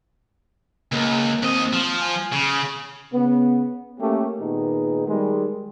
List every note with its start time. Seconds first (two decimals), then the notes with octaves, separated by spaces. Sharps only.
0.92 C#2 A#3
1.42 D#2 C4 D#5
1.73 F3
2.00 G#5
2.33 C#3
3.14 C#3 B3
4.00 A3 A#3 C#4 G4
4.40 A#2 D#3 B3 D#4 G#4
5.07 D#3 G3 G#3